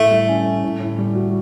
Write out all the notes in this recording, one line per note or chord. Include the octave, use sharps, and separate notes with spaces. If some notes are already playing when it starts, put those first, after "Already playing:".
Already playing: A2 A3
G3
C#4
A2
A2
A2
G3
F#4